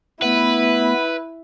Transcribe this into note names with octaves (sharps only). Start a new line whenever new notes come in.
A3 B3 E4 B4